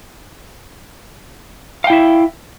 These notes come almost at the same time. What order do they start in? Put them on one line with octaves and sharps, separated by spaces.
F5 G5 E4 E5